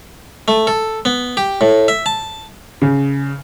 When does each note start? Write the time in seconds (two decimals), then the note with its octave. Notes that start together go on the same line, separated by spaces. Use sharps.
0.48 A3
0.67 A4
1.05 B3
1.37 G4
1.61 A2
1.88 E5
2.06 A5
2.82 C#3